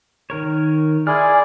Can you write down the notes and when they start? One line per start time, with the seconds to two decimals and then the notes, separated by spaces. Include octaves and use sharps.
0.30 D#3 A#4 C#5
1.07 E4 G#4 D5 G#5 C6 F6